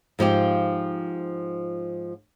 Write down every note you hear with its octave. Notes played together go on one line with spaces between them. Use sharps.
G#2 F3 F4 G4